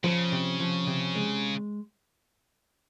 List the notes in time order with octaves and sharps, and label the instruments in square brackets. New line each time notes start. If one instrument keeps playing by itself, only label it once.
[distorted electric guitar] C#3 [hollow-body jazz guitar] F3
[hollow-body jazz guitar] C3
F3
C3
G#3